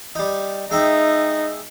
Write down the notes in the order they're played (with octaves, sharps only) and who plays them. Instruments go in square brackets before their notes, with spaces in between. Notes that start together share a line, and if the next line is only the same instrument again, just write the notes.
[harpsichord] G3 D#4
[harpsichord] G#3 E5 G5 [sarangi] D#4